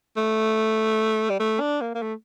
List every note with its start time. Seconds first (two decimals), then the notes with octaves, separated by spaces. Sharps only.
0.17 A3
1.30 G3
1.40 A3
1.60 D4
1.81 A#3
1.95 A#3
2.02 A3